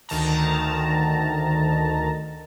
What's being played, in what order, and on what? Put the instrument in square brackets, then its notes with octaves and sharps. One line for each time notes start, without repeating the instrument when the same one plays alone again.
[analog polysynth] D2 D#3 A5 A#5